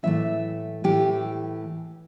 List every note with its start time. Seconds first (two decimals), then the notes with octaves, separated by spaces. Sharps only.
0.03 A2 E3 A3 E5
0.84 A2 E3 A3 G4